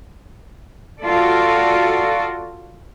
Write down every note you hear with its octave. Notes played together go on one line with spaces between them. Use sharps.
F4 F#4 A4 D5